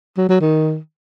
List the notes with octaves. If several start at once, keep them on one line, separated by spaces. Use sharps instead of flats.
F#3
F#3
D#3